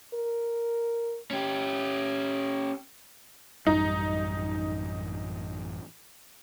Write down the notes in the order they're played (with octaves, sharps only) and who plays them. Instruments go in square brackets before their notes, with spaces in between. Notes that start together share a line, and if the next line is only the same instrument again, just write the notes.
[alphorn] A#4
[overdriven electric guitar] C#4 G4
[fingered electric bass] A1 F#2 G3 [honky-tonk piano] D#4